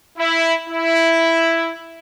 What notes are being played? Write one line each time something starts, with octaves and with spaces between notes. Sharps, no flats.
E4
E4